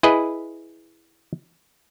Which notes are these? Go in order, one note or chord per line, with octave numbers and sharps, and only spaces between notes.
E4 G#4 B4 D#5